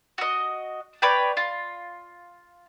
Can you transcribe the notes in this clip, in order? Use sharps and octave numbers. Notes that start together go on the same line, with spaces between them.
F#4 D#5
B4 C#5 D5 G5
F4